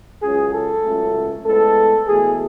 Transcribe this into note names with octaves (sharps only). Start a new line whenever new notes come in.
C#2 C#3 F#3 G#4
A4
C#2 C#3 F#3 A3
A2 G#3 B3 A4
E2 B2 A3 G#4